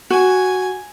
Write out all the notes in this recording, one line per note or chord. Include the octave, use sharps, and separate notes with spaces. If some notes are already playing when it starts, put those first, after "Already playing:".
F#4 G#5